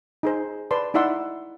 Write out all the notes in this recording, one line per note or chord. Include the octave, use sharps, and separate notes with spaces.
D#4 G#4 C5
B4 D5 A5 C6
D#4 E4 D5 E5 F#5 C6